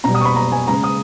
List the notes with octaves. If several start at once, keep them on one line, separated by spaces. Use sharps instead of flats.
B2 G3 A#5
D#6
C#6
B5
A#5
G#5
C#3 G#3 A#5
D#6